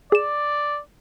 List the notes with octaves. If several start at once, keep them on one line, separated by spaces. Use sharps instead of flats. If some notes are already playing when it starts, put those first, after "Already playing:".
G#4 D5 E7